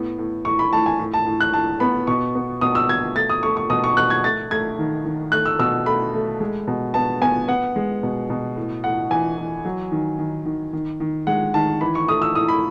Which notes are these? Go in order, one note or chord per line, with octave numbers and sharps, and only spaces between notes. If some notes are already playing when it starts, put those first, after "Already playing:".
Already playing: A2 B3
A2
A2 C#6
B5
A2 A5
G#5
A2
A5
A2
F#6
A2 A5
B3 B5
B2 C#6
B3
B2 D#6
E6
B2 G#6
A3 A6
D#6
A3 C#6
C#6
B2 D#6
C#6
B2 F#6
G#6
A3 A6
A3 G#6
D#3
D#3
A3 F#6
E6
B2 E6
A3 B5
A3
G#3
B2
B3 A5
B3 G#5
B3 F#5
G#3
B2
B2
A2
A2 F#5
E3 G#5
E3
F#3
D#3
D#3
D#3
D#3
D#3
G#3 F#5
D#3 A5
E3 B5
C#6
A3 D#6
E6
A2 D#6
B5